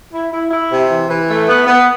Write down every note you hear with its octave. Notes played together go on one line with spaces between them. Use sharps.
E4
E4
E4
C3
E3
E3
A3
B3
B3